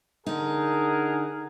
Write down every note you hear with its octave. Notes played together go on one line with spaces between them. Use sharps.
D3 D#4 G#4 A#4 F#5